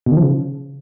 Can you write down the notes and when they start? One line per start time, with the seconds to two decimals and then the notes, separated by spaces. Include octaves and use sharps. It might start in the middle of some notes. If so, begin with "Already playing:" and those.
0.06 B2
0.12 D#3
0.17 F3
0.22 C#3